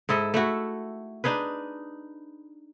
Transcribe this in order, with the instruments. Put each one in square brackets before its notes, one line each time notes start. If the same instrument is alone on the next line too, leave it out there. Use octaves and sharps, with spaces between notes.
[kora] G#2 E4 A4 D#5
A3 E4 F#4
D4 D#4 G#4 B4